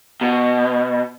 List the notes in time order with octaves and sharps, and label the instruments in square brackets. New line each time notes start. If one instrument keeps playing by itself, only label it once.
[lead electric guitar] B2